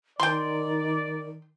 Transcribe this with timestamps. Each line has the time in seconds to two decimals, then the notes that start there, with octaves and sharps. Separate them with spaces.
0.20 D#3 D5 G5 C6